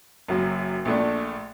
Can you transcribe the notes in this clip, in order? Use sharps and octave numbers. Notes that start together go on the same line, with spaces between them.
F#1 F#2 F#3
A#1 A#2 A3 D4